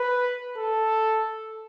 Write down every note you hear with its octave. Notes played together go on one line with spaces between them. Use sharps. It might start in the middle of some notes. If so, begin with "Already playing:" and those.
Already playing: B4
A4